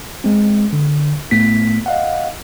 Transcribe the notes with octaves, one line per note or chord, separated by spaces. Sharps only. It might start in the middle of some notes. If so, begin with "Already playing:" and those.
G#3 C4
D3
A2 A3 B3 B6
D#5 F5 F#5